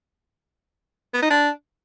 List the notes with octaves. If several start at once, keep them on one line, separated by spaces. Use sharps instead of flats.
B3
D#4
D4